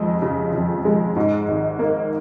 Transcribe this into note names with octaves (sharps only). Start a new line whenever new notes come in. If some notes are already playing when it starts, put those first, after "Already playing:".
Already playing: F2 G#3 D#5
C#3
F2
G#3
G#2
G#1
A#3